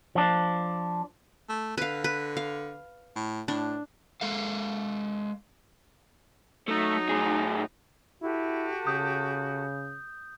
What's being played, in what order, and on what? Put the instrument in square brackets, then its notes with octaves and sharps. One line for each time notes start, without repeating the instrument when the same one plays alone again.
[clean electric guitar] F3 D4
[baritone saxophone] A3
[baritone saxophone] D3 [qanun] B4 F5
[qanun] B4
F5
[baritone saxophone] A2
[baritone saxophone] A2 [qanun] D4
[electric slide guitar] G#3 A4 F5
[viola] F#3 D#4 [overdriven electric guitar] A3
[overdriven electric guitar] A2 G#4
[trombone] E4 [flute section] F#4 G4 A4
[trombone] C#3 [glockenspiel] D#6 G6